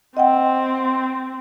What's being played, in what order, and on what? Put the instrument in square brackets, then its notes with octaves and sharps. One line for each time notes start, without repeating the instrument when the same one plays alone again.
[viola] C4 [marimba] D#5 F#5 G5